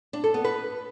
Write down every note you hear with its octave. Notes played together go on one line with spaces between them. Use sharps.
D4
A4
B3
B4